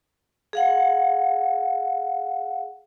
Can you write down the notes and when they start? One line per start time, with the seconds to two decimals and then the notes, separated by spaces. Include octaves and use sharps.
0.53 G#4 F5 F#5